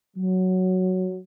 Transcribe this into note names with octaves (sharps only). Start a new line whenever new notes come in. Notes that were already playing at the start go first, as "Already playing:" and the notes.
F#3